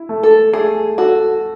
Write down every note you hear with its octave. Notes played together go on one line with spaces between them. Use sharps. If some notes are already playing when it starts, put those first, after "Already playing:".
Already playing: E4
A3
A4
A3 G#4
F#4 A4